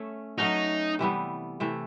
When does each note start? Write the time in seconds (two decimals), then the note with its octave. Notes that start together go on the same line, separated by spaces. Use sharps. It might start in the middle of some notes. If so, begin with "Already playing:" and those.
Already playing: A3 C#4 A4
0.37 F#3 A3 C#4 D#4 F#4
0.99 C3 E3 G3 B3
1.60 C3 E3 A3